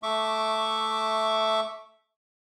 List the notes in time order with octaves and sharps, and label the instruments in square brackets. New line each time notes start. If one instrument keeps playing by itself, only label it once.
[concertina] A3 E5 C#6 D6